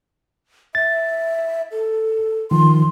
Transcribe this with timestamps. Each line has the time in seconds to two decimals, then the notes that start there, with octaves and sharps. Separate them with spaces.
0.75 E5 A6
1.72 A4
2.51 D#3 F3 C6